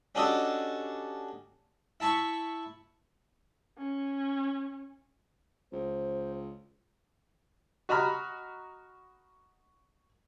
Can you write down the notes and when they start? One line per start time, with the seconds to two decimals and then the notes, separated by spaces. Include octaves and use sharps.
0.15 C#4 D4 F#4 G4 A4 D#5
2.00 E4 A5 B5 C#6
3.78 C#4
5.72 C#2 C5
7.89 F#4 D#5 A#5 B5 F6